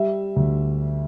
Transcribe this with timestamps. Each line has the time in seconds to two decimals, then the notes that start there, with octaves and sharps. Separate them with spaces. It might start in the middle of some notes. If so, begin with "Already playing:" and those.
Already playing: G3 E5
0.36 D2